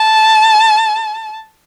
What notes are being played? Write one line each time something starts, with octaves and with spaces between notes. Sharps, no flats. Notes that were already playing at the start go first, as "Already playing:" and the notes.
Already playing: A5